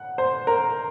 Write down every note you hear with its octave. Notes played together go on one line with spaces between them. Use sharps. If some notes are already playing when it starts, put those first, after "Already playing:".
Already playing: F#5
C5
A#4